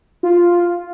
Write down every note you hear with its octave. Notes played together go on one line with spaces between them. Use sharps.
F4